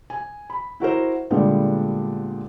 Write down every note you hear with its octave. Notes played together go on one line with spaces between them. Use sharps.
G#5
B5
E4 F#4 A#4 C5
A#2 D3 G3 G#3 B3 D4